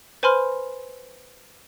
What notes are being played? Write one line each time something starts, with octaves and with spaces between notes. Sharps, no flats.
B4 C5 G#5 B5 C6 F6